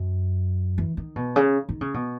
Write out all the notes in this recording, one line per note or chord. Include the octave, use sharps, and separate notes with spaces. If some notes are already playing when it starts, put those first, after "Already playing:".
Already playing: F#2
E3
D#3
B2
C#3
D#3
C#3
B2